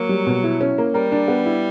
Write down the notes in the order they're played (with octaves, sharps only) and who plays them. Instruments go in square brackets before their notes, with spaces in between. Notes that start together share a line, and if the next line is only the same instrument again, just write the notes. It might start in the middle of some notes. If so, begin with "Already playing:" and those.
Already playing: [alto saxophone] F#3 [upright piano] A#3
[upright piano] G3
B2
E4
C#4
A#3
[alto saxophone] G3 [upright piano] A#4
[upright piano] D4
B3
E4